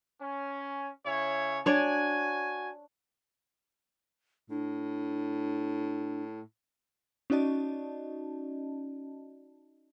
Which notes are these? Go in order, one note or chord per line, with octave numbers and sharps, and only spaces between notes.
C#4
C#3 E4 C#5
D4 F#4 C#5 D5 G#5
A2 D4
C#4 D#4 F#4 D5 D#5 A5